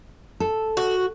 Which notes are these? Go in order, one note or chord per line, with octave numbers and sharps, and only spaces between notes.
A4
F#4